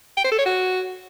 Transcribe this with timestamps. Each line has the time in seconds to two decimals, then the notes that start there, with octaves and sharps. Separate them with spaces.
0.17 G5
0.24 C5
0.31 A4
0.39 C#5
0.46 F#4